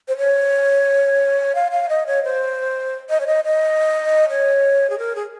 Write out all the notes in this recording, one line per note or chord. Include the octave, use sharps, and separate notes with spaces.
C5
C#5
F5
F5
D#5
C#5
C5
D#5
C#5
D#5
D#5
C#5
G#4
A#4
G#4